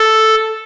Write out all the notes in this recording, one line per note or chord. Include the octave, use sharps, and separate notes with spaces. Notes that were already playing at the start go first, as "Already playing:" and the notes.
Already playing: A4